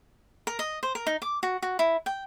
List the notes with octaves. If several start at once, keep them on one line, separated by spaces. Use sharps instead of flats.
A#4
D#5
C5
A#4
D#4
D6
F#4
F#4
E4
G5